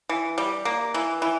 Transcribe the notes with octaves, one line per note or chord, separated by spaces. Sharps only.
E3
G3
A#3
E3
E3